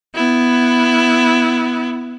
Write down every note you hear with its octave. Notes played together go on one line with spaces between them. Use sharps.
B3 E4